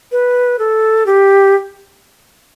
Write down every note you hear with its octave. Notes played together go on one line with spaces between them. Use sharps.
B4
A4
G4